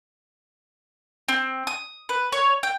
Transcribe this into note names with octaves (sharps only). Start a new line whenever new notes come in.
C4
D#6
B4
C#5
G5